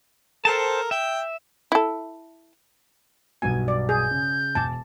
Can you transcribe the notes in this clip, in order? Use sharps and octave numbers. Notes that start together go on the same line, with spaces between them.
A4 A#4 C5 G5 A5
E5 G5
E4 A4
B1 G2 B2 G#5
D5
G#4 G6
C#3
E1 G#5 A5 D6